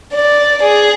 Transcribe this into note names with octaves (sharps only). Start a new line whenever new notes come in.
D5
G#4